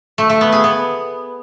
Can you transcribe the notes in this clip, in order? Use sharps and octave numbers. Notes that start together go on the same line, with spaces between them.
A3
A3
B3
G#4
B3